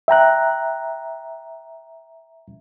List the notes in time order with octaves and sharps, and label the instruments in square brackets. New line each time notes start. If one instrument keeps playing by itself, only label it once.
[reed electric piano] E5 G5 A#5 F#6